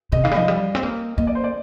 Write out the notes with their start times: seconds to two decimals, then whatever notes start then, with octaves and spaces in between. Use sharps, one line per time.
0.12 C3 D#5
0.24 D#3 F5
0.31 G3
0.36 F3 D#5
0.48 G3
0.75 C4
0.83 A#3
1.17 A#3 D#5
1.27 D5
1.35 C5
1.44 D5